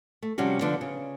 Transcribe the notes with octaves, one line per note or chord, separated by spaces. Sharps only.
A3
C3 F3 G3 C#4 F#4
D3 F3 B3 D4
C#3